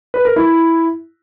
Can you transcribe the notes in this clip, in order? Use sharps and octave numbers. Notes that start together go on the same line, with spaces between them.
B4
A#4
E4